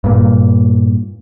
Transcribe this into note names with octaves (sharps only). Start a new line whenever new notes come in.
G2 A#2